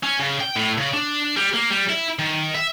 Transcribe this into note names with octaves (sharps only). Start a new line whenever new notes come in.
C#4
C#3
G5
A2
C#3
D4
G3
A#3
G3
E4
D#3
E5